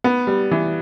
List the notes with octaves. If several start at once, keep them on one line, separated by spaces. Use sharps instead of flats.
B3
G3
E3